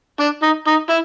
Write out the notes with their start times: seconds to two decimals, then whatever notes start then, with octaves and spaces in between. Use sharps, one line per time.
0.20 D4
0.43 D#4
0.67 D#4
0.89 E4